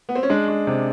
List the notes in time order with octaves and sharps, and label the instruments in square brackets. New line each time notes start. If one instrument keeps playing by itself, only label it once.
[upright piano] B3
C4
C#4
[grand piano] G#3 [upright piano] D4
[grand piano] G#3
C3